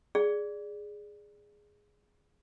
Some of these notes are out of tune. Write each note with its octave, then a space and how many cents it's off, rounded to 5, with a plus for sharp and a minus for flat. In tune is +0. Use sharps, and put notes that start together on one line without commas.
G#4 +0 D5 +0